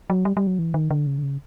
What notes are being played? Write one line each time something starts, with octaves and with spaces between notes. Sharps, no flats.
F#3
G3
G3
F#3
E3
D#3
D3
C#3
D3
C#3